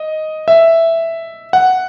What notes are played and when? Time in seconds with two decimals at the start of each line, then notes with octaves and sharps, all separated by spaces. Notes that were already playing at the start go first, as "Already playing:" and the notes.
Already playing: D#5
0.48 E5
1.53 F#5